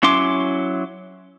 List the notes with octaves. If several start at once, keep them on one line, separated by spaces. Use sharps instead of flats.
F#3 C#4 E4 C6 D6